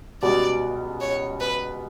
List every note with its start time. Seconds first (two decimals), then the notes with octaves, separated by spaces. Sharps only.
0.22 C#2 B2 G3 B3 F#4 D5
1.01 C#5
1.40 B4